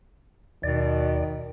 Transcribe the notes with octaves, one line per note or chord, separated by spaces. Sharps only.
D#2 B2 D#3 D5